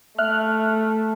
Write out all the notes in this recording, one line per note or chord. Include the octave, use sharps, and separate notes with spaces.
A3 E5 F6 F#6